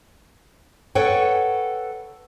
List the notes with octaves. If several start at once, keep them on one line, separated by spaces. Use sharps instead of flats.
A4 B4 C#5 F#5 G5